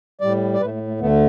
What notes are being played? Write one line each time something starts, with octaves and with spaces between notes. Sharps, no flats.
A2 G3 D5
D5
A2 A3 B4
A3
A3
D2 D3 A3 B3